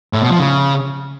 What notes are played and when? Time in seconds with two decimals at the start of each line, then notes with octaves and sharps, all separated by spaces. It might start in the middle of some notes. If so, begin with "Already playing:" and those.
0.13 A2
0.22 B2
0.31 F3
0.39 C#3